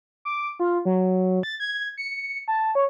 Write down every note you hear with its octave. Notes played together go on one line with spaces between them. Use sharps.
D6
F4
F#3
A6
G#6
C#7
A5
C#5